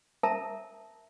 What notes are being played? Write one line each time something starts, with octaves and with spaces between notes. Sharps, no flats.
A#4 E5 A5 A#5